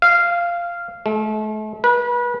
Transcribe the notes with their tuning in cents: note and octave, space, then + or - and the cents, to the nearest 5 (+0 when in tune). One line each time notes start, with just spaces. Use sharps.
F5 -10
A3 -40
B4 -30